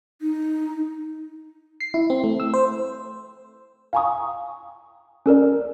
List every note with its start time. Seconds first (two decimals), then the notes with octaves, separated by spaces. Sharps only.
0.22 D#4
1.81 C7
1.94 E4
2.10 C4
2.24 A3
2.40 E6
2.54 C5
3.93 F5 G5 G#5 A#5 C#6 D#6
5.26 C#4 A4 A#4 D5